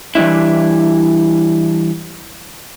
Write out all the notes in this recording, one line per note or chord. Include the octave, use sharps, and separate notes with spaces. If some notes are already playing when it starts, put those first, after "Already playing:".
E3 G3 D4 E4